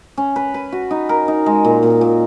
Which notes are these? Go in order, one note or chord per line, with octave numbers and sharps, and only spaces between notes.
C#4
B4
B4
F#4
D#4
A#4
D#4
G#3
A#2
A#2
A#2